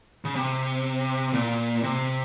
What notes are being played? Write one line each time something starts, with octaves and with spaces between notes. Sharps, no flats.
C#3
C3
A#2
C3